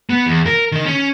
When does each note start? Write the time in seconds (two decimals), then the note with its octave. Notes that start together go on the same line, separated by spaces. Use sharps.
0.10 B3
0.26 E2
0.46 A#4
0.72 D#3 D#4
0.86 C#4